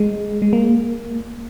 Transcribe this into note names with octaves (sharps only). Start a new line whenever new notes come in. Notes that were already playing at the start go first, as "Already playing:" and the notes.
Already playing: G#3
G#3
A#3